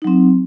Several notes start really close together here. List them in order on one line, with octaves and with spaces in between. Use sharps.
D#4 F#3 C4